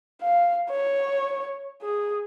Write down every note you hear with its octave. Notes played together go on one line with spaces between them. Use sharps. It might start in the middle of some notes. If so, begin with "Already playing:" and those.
F5
C#5
G#4